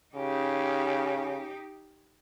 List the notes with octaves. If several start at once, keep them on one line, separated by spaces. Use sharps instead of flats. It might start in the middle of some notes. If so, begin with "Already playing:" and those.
C#3 D#4 G4